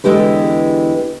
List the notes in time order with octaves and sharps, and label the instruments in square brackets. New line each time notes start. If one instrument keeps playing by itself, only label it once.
[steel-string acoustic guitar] E2 D3 G#3 E4 G4 B4